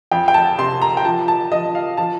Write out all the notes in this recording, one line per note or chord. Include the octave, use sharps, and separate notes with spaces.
F2 G5
G5
A5
C3 C6
A#5
G5
F3 A5
A5
F3 D#5
F5
F3 A5